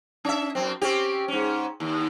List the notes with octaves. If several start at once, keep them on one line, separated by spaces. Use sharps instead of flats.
C#4 E5
F#2 C4
C4 C#4 G4
G#2 C#4
D#2